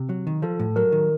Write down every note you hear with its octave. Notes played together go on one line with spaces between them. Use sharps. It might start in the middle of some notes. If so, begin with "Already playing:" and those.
Already playing: C3
F#3
D#3
F3 A4
A2
F#3 A#4
D#3